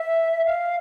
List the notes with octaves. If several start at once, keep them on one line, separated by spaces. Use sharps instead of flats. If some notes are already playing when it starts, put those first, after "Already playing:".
Already playing: E5
F5